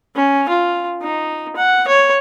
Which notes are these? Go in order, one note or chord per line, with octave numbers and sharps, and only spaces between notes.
C#4
F4
D#4
F#5
C#5